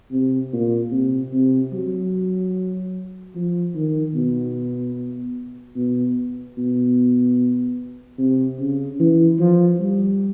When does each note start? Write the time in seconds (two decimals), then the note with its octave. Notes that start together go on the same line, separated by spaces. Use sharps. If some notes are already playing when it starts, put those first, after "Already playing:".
0.11 C3
0.53 A#2
0.92 C3
1.33 C3
1.73 F#3
3.35 F3
3.75 D#3
4.15 B2
5.76 B2
6.58 B2
8.19 C3
8.60 C#3
9.00 E3
9.40 F3
9.79 G3